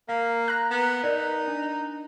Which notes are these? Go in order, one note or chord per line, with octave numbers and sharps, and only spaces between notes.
A#3 F5
A#5 F#6
B3
D#4 A#4 D5
D4